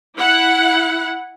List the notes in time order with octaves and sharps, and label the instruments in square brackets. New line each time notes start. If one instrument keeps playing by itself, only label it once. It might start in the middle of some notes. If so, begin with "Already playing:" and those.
[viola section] E4 F#5